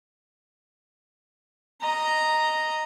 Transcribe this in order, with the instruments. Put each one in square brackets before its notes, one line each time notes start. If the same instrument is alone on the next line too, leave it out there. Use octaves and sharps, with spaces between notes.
[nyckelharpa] D#5 A#5